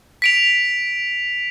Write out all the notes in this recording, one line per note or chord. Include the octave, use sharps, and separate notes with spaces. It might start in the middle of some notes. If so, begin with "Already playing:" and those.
B6 D7 F7